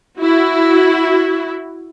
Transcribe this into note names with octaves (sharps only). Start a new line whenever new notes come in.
E4 F#4